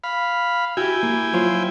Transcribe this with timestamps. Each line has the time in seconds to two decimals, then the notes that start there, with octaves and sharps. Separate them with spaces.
0.04 F5 B5
0.77 E4 F#4 G4 G5 G#5
1.03 A#3
1.34 F#3 F4 C5